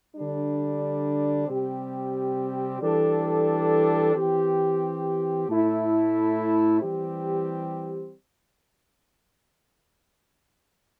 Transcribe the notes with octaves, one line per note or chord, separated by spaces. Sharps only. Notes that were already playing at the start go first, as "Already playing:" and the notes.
D3 G3 D4
C3 G3 C4 G4
E3 G3 D4 A4
E3 C4 G4
A2 A3 E4 A4
E3 G3 C4 G4